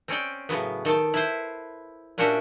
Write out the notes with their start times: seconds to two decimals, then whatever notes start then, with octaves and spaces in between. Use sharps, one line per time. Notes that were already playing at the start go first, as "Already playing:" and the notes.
0.08 C4 C#4 D5 G5
0.49 A2 C#3 F#3 B3
0.85 D#3 A4 G5 A5
1.14 E4 B4 C5
2.18 A#2 C#4 D4 F#4 G4 E5